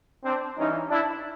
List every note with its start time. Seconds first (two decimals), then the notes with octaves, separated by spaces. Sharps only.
0.24 C4 D4
0.57 G2 E3 C#4 D#4
0.90 D4 E4